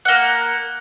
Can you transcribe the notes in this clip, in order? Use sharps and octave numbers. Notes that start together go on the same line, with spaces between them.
A#3 F#5